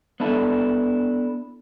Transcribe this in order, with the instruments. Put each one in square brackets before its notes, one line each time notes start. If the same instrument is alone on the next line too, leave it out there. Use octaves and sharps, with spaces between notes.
[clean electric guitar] B3 D4 E4 A4